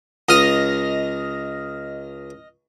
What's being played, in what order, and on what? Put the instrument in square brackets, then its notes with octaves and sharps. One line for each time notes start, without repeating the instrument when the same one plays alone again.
[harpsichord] C#2 D#6 [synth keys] D#5 F6 A#6